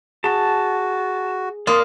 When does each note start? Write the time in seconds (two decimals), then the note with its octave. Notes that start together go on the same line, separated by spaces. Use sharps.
0.24 F#4 G#4 A5
1.67 A#3 D5 C6 D#6